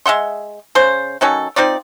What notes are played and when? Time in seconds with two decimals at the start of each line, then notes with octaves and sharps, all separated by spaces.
0.06 G#3 E5 F#5 C6
0.75 C#3 C5
1.21 D#3 F#3 C#4 A4
1.56 C4 D#4 F4 D5